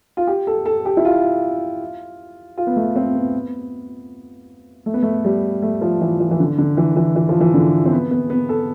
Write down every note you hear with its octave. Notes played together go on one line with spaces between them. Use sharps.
F4
G4
A4
A4
G4
E4
F4
F4
B3
A3
C4
B3
A3
B3
A3
G3
A3
F3
E3
E3
E3
D3
D3
E3
E3
E3
F3
E3
D3
C4
B3
B3
B3
A4